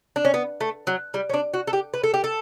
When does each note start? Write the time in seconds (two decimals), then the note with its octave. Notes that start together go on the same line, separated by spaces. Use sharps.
0.16 D4
0.25 C#4
0.34 B3
0.61 A3
0.87 F#3
1.14 G3
1.30 C#4
1.34 D4
1.54 F#4
1.67 A4
1.73 G4
1.94 B4
2.03 A4
2.14 G4
2.24 A4